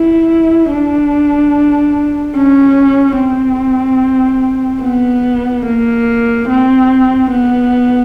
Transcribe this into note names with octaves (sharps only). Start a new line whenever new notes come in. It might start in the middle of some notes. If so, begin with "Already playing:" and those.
Already playing: E4
D4
C#4
C4
B3
A#3
C4
B3